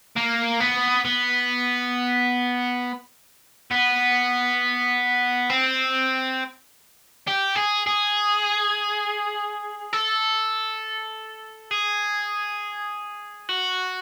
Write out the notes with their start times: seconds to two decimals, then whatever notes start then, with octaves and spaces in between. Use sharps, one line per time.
0.16 A#3
0.61 B3
1.05 B3
3.71 B3
5.50 C4
7.27 G4
7.56 G#4
7.87 G#4
9.93 A4
11.71 G#4
13.49 F#4